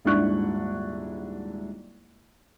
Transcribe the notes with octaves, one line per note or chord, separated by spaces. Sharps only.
D#1 G#2 D4 E4 C#6 F#6